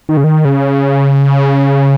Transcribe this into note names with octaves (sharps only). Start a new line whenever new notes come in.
D#3
C#3
D#3
C#3